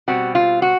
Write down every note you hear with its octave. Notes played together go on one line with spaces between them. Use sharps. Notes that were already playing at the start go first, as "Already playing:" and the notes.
B2 G3 C4 F#4
F4
F#4